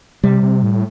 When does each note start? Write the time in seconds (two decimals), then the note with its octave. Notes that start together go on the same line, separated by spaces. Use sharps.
0.24 C3 G3
0.43 C3
0.63 A2